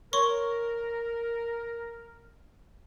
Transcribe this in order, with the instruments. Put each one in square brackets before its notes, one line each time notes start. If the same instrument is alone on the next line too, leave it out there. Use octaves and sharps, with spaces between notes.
[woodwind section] A#4 [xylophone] C#5 C6 C#6